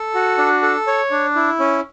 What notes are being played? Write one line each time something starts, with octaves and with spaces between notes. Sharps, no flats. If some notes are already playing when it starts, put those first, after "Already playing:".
Already playing: A4
F#4
D4
A4
C#5
D4
E4
C#4